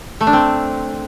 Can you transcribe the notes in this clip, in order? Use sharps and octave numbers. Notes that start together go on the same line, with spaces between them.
A3
D4
C4